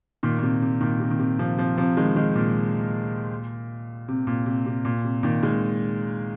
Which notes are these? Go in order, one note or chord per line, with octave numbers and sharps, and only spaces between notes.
A#2 D#3
A#2
C3
C3
A#2 D#3
C3
D#3
C3
C3 F3
C3 F3
C3 F3
D#3 G#3
D#3 G#3
A#2
C3
A#2
C3
C3
A#2
C3
A#2 D#3
D#3 G#3